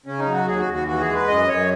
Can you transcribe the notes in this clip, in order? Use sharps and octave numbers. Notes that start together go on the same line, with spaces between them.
C#3 C#4
D#4
F#3
F#4
D#2 G#4
F#4
D#2
F#4
E3 F#4
G#4
G#3
B4
F#2 D#5
F#2 C#5